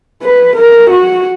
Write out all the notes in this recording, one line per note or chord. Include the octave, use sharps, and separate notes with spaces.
B4
A#4
F#4